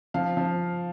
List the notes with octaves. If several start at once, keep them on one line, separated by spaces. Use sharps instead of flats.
F3 F5
F3